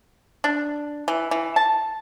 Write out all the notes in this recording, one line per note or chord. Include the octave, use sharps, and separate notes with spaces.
D4
E3
E3
A5